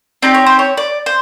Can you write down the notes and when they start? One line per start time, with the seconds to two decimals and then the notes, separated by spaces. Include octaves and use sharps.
0.22 C4 D#4 G4 D5
0.35 C#5
0.46 C5
0.59 C#5
0.77 D5
1.06 C5